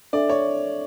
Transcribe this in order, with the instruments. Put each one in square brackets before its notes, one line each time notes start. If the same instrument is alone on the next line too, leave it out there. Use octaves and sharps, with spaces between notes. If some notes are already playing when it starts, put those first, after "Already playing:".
[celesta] D4 A4 E5 [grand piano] D5
[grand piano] C#5